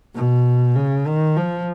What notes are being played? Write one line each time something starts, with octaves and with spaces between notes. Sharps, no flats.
B2
C#3
D#3
F3